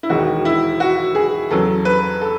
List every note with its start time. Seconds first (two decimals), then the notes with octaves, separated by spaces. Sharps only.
0.03 E4
0.10 E1 D#2 D#3 G#3 F#4
0.45 E4
0.80 F#4
1.15 G#4
1.51 E2 C#3 F#3 A4
1.85 B4
2.21 A4